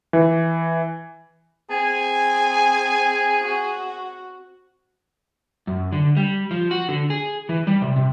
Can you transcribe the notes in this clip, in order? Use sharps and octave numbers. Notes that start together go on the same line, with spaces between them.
E3
C4 G#4 G#5
F#4
F#2
D3
G3
F3
F#4
D3
G#4
E3
G3
C3
C3